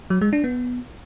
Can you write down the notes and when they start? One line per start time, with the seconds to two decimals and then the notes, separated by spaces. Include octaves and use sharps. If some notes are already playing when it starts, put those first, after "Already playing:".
0.10 F#3
0.21 G#3
0.33 D4
0.44 B3